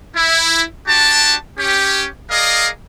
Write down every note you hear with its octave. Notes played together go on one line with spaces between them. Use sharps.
E4
D4 F#4 G4 A5
C#4 G4
G#4 A#4 D5 D#5 F5